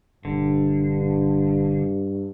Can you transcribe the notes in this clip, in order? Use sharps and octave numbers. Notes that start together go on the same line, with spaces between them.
E1 G2 D3